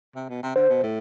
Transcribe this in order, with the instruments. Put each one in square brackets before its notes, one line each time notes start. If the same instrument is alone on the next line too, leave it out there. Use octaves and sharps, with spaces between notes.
[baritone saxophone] C3
B2
C3
[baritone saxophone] D3 [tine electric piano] C5
[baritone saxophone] B2
A2